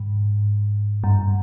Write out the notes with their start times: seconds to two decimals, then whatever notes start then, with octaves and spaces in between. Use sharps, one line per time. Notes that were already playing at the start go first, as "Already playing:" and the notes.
Already playing: G#2
1.04 G2